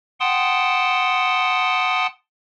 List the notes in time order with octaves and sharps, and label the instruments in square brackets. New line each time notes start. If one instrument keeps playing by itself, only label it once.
[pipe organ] F#5 G5 A5 C6 D#6